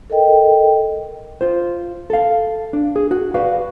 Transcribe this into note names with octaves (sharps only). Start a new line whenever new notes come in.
A4 A#4 D#5 G5
F4 C5
A4 F5
D4
G#4
F#4
F#4 B4 D5 F5